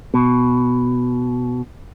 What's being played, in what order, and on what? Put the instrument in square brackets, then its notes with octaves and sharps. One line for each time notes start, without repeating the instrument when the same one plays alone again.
[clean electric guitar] B2